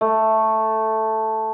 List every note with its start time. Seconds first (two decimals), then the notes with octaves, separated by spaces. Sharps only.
0.01 A3